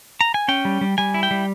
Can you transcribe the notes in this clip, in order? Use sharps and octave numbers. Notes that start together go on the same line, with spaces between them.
A#5
G#5
C#4 G5
G3
G3
G3 G#5
E4
G5
G3